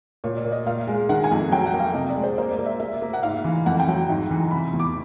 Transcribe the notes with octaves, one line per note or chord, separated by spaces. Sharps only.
A#2 C#5
D5
A#2
D#5
A#2 F5
G#3
D#3 F#5
G#5
F2
F#3 G5
F#5
A#3
F5
C3 D#5
D5
G#3
C5
A#3 C5
D5
A#3
E5
A#3 E5
A#3
F#5
G#2 F5
E3
F2 F#5
G5
F#3
G#2
E3
C3 B5
E2
D6